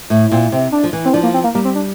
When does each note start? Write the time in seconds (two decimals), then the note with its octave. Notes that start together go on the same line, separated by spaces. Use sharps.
0.10 A2
0.32 A#2 C4
0.52 C3 C4
0.72 D4
0.84 F3
0.93 E3
1.05 C4
1.13 F3 D4
1.23 A#3
1.34 C4
1.44 A#3
1.54 G3 A#3
1.65 C4
1.75 D4